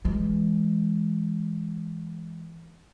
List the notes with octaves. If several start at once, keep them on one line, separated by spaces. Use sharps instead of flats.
E3 G#3